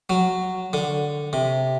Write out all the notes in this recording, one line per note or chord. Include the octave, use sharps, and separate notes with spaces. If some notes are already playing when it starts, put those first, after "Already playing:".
F#3
D3
C3